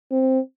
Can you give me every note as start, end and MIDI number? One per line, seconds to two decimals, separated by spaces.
0.11 0.39 60